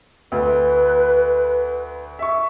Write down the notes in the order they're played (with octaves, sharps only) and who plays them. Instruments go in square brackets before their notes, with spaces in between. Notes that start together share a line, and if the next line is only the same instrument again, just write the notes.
[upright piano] D2 [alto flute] B4
[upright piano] E5 C#6